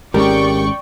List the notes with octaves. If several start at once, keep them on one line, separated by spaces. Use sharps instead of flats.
G#1 G#3 C#4 G4 A#4 D5 G5 C#6